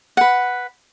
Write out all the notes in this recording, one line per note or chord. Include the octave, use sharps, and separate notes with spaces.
B4 F#5